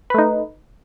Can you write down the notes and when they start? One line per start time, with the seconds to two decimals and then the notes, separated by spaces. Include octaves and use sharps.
0.10 B4
0.14 A3
0.18 D#4